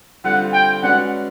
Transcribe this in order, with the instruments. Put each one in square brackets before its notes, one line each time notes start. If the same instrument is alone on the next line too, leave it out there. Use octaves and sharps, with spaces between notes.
[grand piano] D3 G3 C4 F4 [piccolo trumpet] F#5
[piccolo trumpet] G5
[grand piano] G#3 C#4 F#4 B4 D5 [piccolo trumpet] F#5